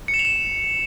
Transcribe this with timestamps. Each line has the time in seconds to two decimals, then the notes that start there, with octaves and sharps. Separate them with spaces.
0.08 C#7
0.14 E7
0.19 F7
0.25 E7